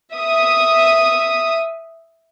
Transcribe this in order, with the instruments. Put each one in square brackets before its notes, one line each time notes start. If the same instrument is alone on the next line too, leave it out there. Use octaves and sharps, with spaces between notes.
[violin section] E5 D#6